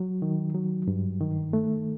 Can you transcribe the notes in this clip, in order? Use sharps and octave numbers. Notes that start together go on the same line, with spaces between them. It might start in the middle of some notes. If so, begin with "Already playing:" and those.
Already playing: F#3
D#3
F#3
G2
D#3
A3